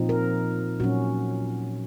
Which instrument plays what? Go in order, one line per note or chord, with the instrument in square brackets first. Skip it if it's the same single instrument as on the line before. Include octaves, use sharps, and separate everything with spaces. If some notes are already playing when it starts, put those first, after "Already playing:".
Already playing: [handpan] A#2 F3 C4 D#4
A#4
A#2 F#3 C#4 F#4